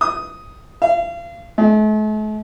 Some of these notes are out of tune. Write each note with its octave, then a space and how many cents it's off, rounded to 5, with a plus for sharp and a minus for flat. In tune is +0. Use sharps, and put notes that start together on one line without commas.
D#6 +5
F5 -35
A3 -45